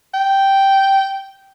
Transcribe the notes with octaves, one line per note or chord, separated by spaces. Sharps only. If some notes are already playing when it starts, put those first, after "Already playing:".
G5